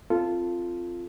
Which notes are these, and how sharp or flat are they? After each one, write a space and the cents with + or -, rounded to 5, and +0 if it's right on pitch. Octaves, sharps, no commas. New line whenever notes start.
C4 +0 F4 -10 A4 +0